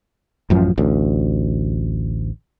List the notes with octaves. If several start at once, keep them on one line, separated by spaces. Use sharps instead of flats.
A1 F#2 F3
A1 D2